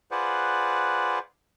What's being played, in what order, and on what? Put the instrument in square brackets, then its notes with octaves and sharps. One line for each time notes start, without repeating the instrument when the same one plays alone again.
[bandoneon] F4 G#4 B4 C5 D5 F#5